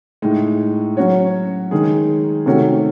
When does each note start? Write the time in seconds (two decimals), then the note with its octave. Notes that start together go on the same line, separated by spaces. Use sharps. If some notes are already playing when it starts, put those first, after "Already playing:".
0.22 A2 G#3 D#4
0.97 F#3 C#4 F#4 C#5
1.71 D#3 G#3 D#4 G#4
2.46 C3 D#3 A3 C#4 F#4